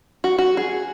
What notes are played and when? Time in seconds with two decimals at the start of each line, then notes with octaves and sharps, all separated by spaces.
0.24 F#4
0.38 F#4
0.57 G#4